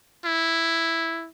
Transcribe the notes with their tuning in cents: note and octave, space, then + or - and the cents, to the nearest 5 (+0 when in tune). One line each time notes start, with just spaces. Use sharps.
E4 +0